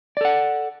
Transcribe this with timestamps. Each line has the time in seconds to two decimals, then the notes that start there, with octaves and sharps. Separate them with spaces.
0.17 D5
0.21 A4
0.25 F#5